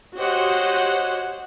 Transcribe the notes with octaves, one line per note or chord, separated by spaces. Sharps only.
F#4 G4 C5 C#5 D#5 F#5